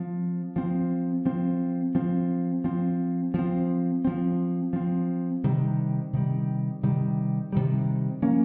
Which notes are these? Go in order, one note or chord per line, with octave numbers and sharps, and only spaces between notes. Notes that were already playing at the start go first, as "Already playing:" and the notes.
Already playing: F3 C4
F3 C4
F3 C4
F3 C4
F3 C4
F3 C4
F3 C4
F3 C4
C3 D#3 G3
C3 D#3 G3
C3 D#3 G3
C3 D#3 G3
F3 A#3 C#4